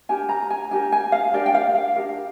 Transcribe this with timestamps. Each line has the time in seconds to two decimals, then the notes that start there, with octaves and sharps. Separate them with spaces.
0.09 D4 G4 A#4 G#5
0.29 A#5
0.50 G#5
0.71 D4 G4 A#4 G#5
0.92 G#5
1.12 F5
1.33 D4 G4 A#4 D5
1.46 G5
1.54 F5
1.75 F5
1.96 D4 G4 A#4 F5